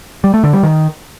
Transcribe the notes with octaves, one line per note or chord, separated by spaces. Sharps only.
G3
A3
D3
G3
D#3